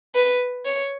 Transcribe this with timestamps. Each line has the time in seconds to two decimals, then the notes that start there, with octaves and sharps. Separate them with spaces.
0.15 B4
0.65 C#5